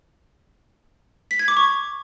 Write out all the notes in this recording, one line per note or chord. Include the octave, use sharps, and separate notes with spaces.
B6
G#6
D6
C#6